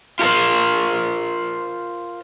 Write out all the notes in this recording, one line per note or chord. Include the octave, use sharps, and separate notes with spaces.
F4 G4 A4 A#4 C5